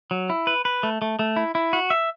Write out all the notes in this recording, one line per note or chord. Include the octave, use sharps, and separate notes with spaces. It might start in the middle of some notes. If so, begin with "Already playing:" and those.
F#3
E4
B4
B4
A3
A3
A3
E4
E4
F#4
E5